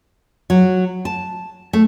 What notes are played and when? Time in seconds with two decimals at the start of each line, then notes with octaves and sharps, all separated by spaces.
0.50 F#3
1.05 A5
1.73 A3